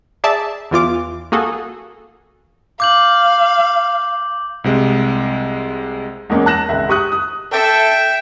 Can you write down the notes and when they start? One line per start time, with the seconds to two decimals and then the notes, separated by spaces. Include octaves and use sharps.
0.24 G#4 D5 E5 A5
0.71 E2 E3 F4 D6
1.32 A#3 F#4 G#4 A4
2.80 F5 D6 G6 F#7
4.64 C2 C3 G#3
6.30 E2 G#3 A#3 C#4
6.46 A5 F#6 A#6 E7
6.69 G#1 C#2 E5
6.89 G4 C#6 D#6 F#6
7.12 D#6
7.52 A4 E5 G5